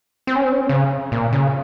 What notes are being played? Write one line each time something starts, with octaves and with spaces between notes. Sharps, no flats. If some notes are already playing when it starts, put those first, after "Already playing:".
C4
C#4
C4
C#4
C4
C#3
A#2
C#3